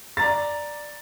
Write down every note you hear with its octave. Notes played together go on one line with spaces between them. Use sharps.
D5 A#5 A6